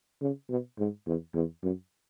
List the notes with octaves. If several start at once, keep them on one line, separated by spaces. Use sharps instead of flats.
C#3
B2
G#2
E2
E2
F#2